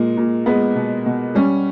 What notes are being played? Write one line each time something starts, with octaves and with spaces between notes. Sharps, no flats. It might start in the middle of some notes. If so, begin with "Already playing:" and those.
Already playing: A#2 G#3
A#2
G#3 B3
B2
B2
G3 C#4